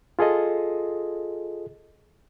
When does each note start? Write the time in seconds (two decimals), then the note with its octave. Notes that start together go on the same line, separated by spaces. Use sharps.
0.19 F4 G#4 A4 D#5